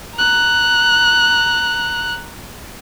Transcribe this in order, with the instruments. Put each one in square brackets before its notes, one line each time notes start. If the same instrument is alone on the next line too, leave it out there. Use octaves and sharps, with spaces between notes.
[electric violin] A#5 F#6